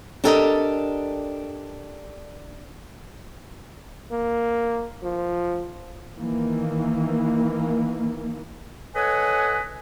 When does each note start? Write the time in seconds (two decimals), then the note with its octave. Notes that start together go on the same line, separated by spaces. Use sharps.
0.24 D4 G4 A4 A#4 D#5
4.11 A#3
5.02 F3
6.17 D#3 E3 A#3
8.95 A4 B4 C#5 D#5 F#5 G#5